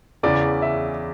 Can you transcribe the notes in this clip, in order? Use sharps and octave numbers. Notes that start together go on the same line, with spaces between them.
E2 C#3 E3 D5
E5